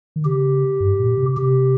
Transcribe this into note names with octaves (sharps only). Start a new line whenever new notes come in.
D#3
C#3 G4
G2
A#2
C3
C3 G4